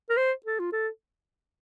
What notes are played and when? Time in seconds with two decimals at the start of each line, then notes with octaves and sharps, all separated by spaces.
0.10 A#4
0.17 C5
0.46 A4
0.59 F4
0.73 A4